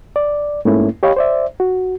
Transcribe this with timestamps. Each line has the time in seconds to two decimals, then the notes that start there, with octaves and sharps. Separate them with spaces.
0.16 D5
0.65 G#2 A3 A#3 C#4 E4
1.03 G4 C#5 D#5 F5 B5
1.16 C5 D5 E5
1.60 F#4